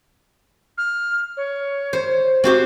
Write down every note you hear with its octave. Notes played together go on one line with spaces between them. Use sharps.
F6
C#5
C5
C4 F#4 G4 C5